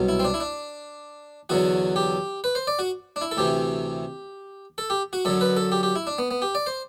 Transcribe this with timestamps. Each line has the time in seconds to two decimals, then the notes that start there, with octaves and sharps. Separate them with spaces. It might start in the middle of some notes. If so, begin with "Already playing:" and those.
Already playing: C2 B2 F#3
0.09 E4
0.19 C4
0.25 D4
0.34 E4
0.40 D4
1.49 E2 D3 F#3 F#4
1.96 G4
2.44 B4
2.55 C5
2.67 D5
2.79 F#4
3.16 D4
3.21 E4
3.31 A4
3.37 D2 C3 E3 G4
4.78 A4
4.90 G4
5.13 F#4
5.25 F#2 D3 F#3 A4
5.41 B4
5.57 A4
5.72 G4
5.83 G4
5.96 E4
6.07 D4
6.18 B3
6.31 B3
6.42 G4
6.55 D5
6.66 C5